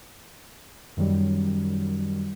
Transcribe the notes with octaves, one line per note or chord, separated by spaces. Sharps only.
F#2 D#3 F#3 G3